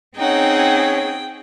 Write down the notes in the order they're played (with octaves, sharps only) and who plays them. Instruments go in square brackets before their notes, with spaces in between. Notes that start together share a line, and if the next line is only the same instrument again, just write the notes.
[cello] C4 G#4 [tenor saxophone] C#4 [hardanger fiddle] D#4 F#5 [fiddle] G5